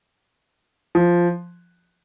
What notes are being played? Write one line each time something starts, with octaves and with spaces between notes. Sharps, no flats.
F3